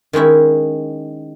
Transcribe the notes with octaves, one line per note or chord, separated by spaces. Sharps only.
D#3 G#3 C#4 E4